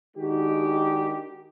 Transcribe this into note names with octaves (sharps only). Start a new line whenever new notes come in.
D#3 G#3 D4 D#4 F#4 G4